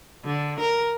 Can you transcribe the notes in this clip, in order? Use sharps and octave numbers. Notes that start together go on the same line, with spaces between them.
D3
A#4